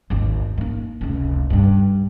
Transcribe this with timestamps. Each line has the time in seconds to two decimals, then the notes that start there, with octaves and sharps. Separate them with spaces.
0.10 G#1 D#2
0.58 A#3 D#4
1.01 F1 C#2
1.50 G2 D3